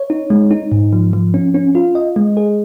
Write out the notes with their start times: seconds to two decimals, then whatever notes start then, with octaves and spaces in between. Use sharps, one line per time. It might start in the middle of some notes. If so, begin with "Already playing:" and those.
Already playing: C#5
0.10 D#4
0.30 G#3
0.51 D#4
0.72 G#2
0.93 F3
1.13 F3
1.34 C#4
1.54 C#4
1.75 F4
1.95 D#5
2.16 G#3
2.37 G#4